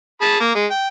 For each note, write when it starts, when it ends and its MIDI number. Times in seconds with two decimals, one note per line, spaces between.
0.21 0.37 68
0.21 0.37 81
0.21 0.37 83
0.40 0.53 58
0.55 0.66 56
0.71 0.87 79